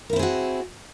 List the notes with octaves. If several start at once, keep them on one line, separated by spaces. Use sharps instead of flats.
C4 E4 F#4 G#4 A#4